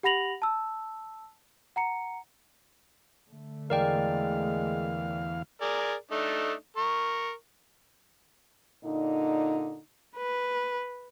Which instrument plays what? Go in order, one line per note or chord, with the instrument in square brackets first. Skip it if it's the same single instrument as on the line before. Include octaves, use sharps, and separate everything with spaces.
[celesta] G4 F#5 B5 A#6 F7 F#7
A5 E6
F#5 A#5 C#7
[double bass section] D3 A3
[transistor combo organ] E2 F5 [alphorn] G#3 [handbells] A#4 D5 G5
[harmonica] G#4 A#4 D5
A3 D4 D#4
A#4 C#6
[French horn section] A#2 D3 D#4
[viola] B4